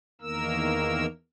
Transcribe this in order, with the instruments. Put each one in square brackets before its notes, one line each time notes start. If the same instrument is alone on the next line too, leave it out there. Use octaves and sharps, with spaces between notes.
[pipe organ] E2 D#3 A#3 A#4 E6